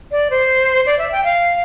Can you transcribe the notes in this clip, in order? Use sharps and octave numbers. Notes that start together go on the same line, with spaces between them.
D5
C5
D5
E5
G5
F5